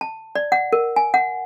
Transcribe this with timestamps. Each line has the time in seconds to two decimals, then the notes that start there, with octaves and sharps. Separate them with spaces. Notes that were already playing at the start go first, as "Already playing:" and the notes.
0.01 A5
0.35 D5
0.52 F#5
0.73 A#4
0.96 G#5
1.14 F#5